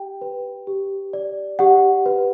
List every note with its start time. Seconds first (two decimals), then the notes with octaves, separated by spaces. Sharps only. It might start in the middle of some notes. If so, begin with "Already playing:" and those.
Already playing: G4 G5
0.21 B4
0.67 G4
1.13 D5
1.59 G4 F#5
2.06 B4